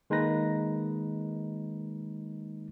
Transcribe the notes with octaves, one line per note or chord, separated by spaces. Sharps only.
D#3 G#3 A#3 D#4 B4 A#6